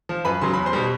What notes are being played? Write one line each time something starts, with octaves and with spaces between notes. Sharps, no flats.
F3
F#2 B4 B5
C#3 F#3 C6
E2 B5
C5 C6
B2 G3